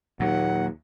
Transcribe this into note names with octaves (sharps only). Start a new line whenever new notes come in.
D#2 A#2 F#3 F#5